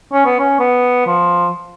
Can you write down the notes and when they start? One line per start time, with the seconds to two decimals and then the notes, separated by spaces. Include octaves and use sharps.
0.13 C#4
0.26 B3
0.39 C#4
0.60 B3
1.07 F3